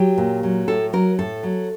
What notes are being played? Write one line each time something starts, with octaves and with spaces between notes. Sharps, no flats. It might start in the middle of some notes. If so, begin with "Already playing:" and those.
Already playing: F#3 G4
A#2
F#3
A2 A4
F#3 A#4
A2 A4
F#3